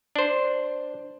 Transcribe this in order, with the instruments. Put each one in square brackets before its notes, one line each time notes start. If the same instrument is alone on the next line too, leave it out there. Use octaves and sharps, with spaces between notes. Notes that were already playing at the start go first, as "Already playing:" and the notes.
[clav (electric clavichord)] D4 C5